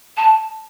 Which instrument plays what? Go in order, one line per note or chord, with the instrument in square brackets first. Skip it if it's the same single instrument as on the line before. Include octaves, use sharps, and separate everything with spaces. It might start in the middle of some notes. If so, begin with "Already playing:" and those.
[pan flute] A5